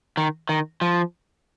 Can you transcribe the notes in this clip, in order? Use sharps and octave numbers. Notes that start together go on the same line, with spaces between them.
D#3
D#3
F3